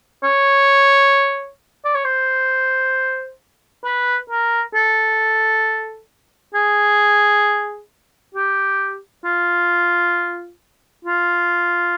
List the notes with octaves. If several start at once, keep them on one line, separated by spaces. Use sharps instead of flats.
C#5
D5
C#5
C5
B4
A#4
A4
G#4
G4
F4
F4